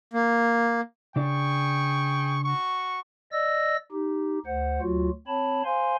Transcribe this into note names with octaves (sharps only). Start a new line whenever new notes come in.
A#3
C#3 D4 G#4 D5 G5 C#6
F#4 C#6
D5 D#5 E6 A#6
D#4 G4
D2 C5 F#5
D2 F#3 F4 F#4
C4 C#5 A5 B5
C5 F5 G#5 C6